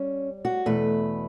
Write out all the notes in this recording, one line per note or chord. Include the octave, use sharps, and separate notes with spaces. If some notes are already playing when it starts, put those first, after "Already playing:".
Already playing: G3 C#4
F#4
E2 B2 A3 B4